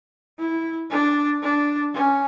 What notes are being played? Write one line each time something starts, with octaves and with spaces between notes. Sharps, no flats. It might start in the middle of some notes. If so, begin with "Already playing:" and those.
E4
D4
D4
C#4